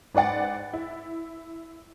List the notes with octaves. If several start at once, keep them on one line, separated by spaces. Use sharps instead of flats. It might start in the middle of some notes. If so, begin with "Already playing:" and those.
G#2 B4 D5 F#5 A6
E4